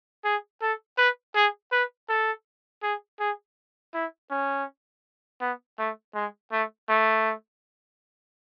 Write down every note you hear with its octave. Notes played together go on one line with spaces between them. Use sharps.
G#4
A4
B4
G#4
B4
A4
G#4
G#4
E4
C#4
B3
A3
G#3
A3
A3